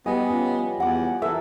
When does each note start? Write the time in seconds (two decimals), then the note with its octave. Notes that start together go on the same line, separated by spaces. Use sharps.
0.06 G3 B3 G4 D#5 G#5
0.30 C#4 F4
0.80 E2 F#5 D6
1.22 E3 A4 A#4 E5